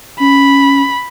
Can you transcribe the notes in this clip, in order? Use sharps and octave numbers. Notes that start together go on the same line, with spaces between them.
C#4 B5